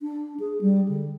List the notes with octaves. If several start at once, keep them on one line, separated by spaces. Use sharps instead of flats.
D4
G#4
G3
D3